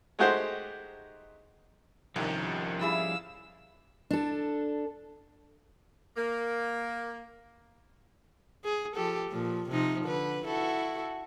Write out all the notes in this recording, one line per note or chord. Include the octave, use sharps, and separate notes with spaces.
G#3 A3 D#4 F#4 G4 C5
C2 C3 D#3 F3 C#4 G4
G3 E4 G#4 F5 E6
D4 A4
A#3
G#4
F3 G4 A4
A#2 F3
C3 F3 D#4
D3 B4
E4 F#4 A4